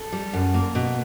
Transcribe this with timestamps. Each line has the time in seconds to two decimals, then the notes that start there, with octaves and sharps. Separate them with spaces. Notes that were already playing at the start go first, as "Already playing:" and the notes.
Already playing: A4
0.12 G3
0.33 F#2
0.54 A#3
0.75 B2